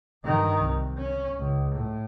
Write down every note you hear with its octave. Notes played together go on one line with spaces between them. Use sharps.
G2 D#3
C2
C#4
C#2
A2